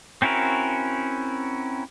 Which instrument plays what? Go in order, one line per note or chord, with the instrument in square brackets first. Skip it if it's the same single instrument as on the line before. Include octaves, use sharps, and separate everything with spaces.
[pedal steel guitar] C4 C#4 E4 F#4 A#4